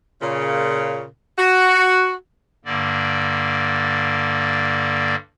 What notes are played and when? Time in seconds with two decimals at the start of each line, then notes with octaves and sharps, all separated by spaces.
0.22 A#2 C#3
1.38 F#4
2.65 G2 D3 A#3 D5